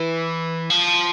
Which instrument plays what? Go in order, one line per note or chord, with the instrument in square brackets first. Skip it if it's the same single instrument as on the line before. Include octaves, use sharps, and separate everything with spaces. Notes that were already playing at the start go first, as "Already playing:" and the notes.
Already playing: [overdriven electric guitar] E3
F3